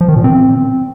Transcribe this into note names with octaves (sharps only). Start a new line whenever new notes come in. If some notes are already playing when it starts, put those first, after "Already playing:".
F3
D#3
A#2
C4